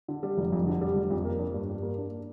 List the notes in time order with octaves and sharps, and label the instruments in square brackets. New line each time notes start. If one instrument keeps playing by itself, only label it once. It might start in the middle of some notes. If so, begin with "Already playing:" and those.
[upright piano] D3
G3
F1
F2
D3
G3
F1
F2
A#3
D4
G2
G3
A#3
D4